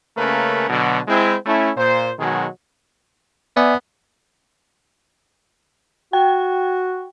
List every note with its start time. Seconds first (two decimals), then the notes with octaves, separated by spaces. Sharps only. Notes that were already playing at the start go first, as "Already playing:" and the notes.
0.17 C#3 A3 A#3 C#4 A#4 B4
0.69 B2 D3 F#3
1.08 G#3 C4 E4
1.46 A3 C#4 E4
1.77 A#2 C5
2.19 B2 D#3 F#3 G#3
3.57 B3 D5 E5 G#5
6.13 F#4 G5